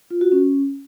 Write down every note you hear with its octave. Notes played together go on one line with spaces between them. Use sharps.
F4
F#4
C#4